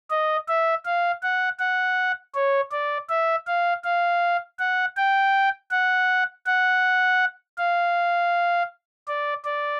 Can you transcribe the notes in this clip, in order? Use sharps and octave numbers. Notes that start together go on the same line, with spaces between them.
D#5
E5
F5
F#5
F#5
C#5
D5
E5
F5
F5
F#5
G5
F#5
F#5
F5
D5
D5